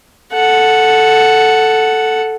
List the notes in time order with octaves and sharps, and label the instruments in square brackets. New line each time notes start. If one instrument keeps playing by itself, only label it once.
[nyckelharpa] A4 F#5